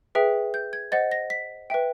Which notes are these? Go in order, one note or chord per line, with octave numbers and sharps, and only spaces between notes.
G#4 B4 E5 G5
G6
G#6
C5 D#5 F#5 A6
A#6
B6
B4 E5 G5